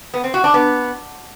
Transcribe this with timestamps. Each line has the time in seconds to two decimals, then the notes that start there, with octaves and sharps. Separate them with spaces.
0.14 B3
0.24 C4
0.34 F#4
0.44 D4
0.54 B3